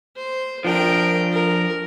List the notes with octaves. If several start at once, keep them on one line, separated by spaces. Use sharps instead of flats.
C5
F3 D4 A#4 G5
A#4